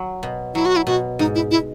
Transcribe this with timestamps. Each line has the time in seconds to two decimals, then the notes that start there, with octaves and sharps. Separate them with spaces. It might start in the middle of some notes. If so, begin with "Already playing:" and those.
Already playing: F#3
0.23 B2
0.54 F#3 E4
0.66 F#4
0.76 E4
0.87 B2 F#4
1.19 G#2 D#4
1.35 E4
1.51 E4